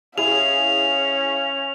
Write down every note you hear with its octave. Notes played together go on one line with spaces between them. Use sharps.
C#4 E4 G#4 F5 F7